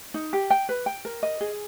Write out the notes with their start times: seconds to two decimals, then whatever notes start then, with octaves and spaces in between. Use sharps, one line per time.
0.14 D#4
0.33 G4
0.50 G5
0.69 B4
0.86 G5
1.05 A#4
1.23 D#5
1.41 G#4